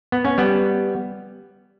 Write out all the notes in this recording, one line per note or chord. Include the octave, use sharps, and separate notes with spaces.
B3
C#4
G3 B3